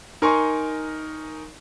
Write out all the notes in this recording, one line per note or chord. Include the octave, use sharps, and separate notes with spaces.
D#4 A#4 G#5 C6 C#6